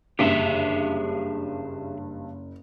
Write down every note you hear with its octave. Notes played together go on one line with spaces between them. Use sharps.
F#1 G2 G4 G#4 E5 B6